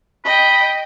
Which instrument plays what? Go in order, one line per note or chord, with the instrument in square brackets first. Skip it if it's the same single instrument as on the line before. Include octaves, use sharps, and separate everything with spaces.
[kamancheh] D#5 G5 [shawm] B5